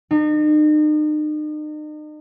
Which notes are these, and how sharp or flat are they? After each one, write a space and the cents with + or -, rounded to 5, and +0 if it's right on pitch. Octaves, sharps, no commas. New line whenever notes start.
D#4 -40